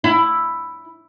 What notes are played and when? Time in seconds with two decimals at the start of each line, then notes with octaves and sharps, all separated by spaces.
0.04 E4